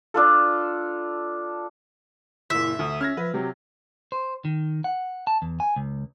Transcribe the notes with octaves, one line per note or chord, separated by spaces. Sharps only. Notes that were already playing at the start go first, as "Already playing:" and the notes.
D4 F4 A4
F#1 A#2 E4 E5
D2 D#6
C#4 F6 G#6 A#6
F3 B4
C3 F#3 G4
C5
D#3
F#5
A5
E2
G#5
C#2